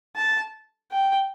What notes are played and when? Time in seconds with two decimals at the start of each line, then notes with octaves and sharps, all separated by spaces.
0.16 A5
0.92 G5